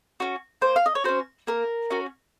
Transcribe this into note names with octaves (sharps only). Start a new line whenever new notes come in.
C#4 F#4
A#3 C5
F5
D#5
C#5
C#4 F#4 C5
A#3 A#4
C#4 F#4